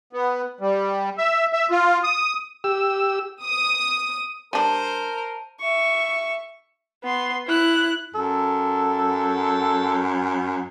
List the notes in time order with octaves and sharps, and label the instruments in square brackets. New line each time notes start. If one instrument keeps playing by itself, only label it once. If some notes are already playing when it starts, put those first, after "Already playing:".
[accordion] B3
G3
E5
E5
F4
D#6
[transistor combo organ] G4 E6
[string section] D#6
[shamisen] G3 D4 [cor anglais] A#4 [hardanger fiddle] C5 [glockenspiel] A5 D#7
[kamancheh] E5 C#6
B3 C6
E4 F#6
[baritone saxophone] F#2 [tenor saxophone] A4